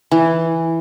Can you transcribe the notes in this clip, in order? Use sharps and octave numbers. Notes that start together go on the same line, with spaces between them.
E3